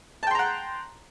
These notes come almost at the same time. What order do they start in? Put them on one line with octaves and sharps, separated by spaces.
A5 G5 C6 A#5 F#5